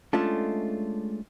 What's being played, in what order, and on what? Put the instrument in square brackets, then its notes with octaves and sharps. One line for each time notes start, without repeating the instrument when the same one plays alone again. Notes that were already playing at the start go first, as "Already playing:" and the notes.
[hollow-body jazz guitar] G#3 A3 C#4 D4 F4 A4